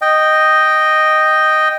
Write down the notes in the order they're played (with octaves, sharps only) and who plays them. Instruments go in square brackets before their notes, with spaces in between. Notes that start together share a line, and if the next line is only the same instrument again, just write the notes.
[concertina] D#5 G5